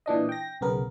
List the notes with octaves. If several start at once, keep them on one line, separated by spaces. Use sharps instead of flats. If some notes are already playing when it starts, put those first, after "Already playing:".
A#2 E3 D4 D#5
G5 A#6
B1 C#3 B3 A#4